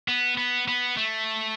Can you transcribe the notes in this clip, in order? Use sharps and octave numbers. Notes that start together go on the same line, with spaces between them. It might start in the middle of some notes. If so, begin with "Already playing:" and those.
B3
B3
B3
A3